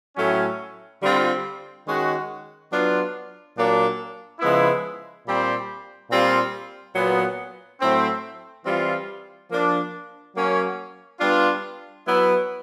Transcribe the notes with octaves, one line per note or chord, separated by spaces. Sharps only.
A2 F#3 A3 C#4
D3 G3 C4 F4
D#3 G#3 C#4 F#4
F#3 B3 D4 F4
A#2 F#3 A#3 D4
C#3 F3 G#3 B3 E4
A#2 G3 C4
A#2 G3 C4 F4
A#2 F#3 B3
A2 F#3 A3 C4
E3 G3 C4 F4
F3 A#3 D4
F#3 A#3 C#4
G3 B3 D4 F4
F#3 B3 E4